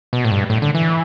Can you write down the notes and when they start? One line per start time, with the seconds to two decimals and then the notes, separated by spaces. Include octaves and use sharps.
0.13 B2
0.25 A2
0.31 G2
0.50 A2
0.62 D3
0.75 E3